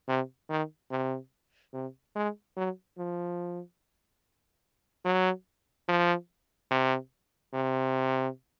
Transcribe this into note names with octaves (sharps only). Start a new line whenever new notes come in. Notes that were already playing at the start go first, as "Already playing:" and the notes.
C3
D#3
C3
C3
G#3
F#3
F3
F#3
F3
C3
C3